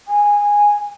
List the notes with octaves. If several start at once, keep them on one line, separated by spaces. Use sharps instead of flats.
G#5